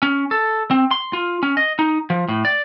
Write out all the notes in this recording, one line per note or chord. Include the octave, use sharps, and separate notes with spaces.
C#4
A4
C4
C6
F4
C#4
D#5
D#4
F3
A2
D5